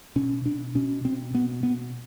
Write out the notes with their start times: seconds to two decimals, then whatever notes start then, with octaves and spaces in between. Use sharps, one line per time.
0.16 B2 C#4
0.45 B2 D4
0.75 B2 C#4
1.04 B2 C4
1.34 B2 B3
1.63 B2 B3